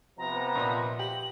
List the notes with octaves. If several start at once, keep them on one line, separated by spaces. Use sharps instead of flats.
C3 F3 B3 A#5
A#2 D#5 B5
G4 F#7